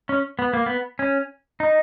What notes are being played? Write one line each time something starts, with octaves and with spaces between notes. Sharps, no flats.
C#4
B3
A#3
B3
C#4
D#4